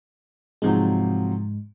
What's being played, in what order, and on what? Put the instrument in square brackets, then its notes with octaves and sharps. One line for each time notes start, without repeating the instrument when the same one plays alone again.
[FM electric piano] G#2 G#3 [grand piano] C3 F3 F#3